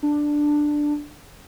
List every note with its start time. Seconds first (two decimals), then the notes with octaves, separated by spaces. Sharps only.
0.03 D4